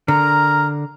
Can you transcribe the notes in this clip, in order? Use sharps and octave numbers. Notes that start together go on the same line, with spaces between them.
D3 A#4 A#5